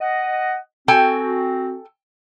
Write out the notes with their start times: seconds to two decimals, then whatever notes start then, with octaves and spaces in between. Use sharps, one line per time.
0.01 D#5 F#5
0.88 C4 F#4 A4 G5 G#5